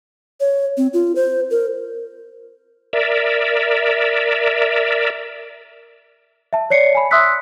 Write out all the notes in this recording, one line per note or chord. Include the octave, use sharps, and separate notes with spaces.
C#5
C4
F4
C5
A#4
A#4 D5 E5
E5 A5
C#5 D5 C7 C#7
G#5 B5
E5 C6 D#6 E6 F#6 B6